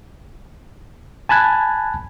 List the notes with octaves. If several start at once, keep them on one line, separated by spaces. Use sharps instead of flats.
G#5 A5 B5 F#6 G#6